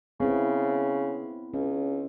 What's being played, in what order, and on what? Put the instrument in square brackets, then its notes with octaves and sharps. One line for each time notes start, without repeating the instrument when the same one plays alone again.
[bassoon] C#3 [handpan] B3 C4 E4
[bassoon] C#2 [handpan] C#4